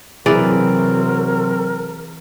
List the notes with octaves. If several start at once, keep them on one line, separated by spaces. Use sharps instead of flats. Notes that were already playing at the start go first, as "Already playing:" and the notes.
C3 E3 F#3 C4 G#4 A#4 D5